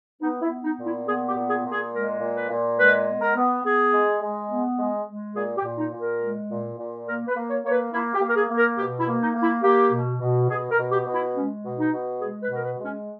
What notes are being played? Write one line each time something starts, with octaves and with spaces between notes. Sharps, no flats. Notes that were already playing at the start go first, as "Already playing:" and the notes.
B3 D#4
E4
B3
D#4
A#2
E4
B3 G#4
G4
A#2
G#4
A#2
G#4
G#3 A#4
A#2
B4
A#2
G#3 B4
B3
A#4
B3
B3 G#4
G#3
G#3
B3
G#3
G#3
A#2 G#4
G4
A#2
D#4
A#2
A#4
G#3
A#2
A#2
A#3 A#4
B4
A#3
C#5
A#3 C#5
B4
A#3 E4
G4
A#3
A#4
G#4
A#3
A#4
B2 G4
E4
A#3
D#4
A#3
E4
A#3 G4
B2
B2
B2 G#4
A#4
B2
G4
B2
E4
G#3 C#4
B2
D#4
B2
G#3 G#4
B4
B2
A#4
B4
G#3
C#4